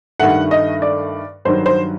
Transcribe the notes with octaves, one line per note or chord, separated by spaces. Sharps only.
G2 D#3 A3 F#5
D#5
D5
G2 D#3 F#3 C5
C5